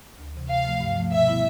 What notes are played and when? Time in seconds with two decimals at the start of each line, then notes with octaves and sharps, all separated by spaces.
0.18 D2
0.34 C3 E3
0.49 C3 F5
0.65 F3 A3
0.80 G2
0.96 F3 A3
1.12 B2 E5
1.27 G3 B3 E4